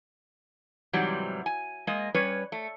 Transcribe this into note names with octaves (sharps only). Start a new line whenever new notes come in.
G#2 C3 E3 F#3 G3
G#5
G#3 A#3 D#5
G3 C#4 B4 C#5
A3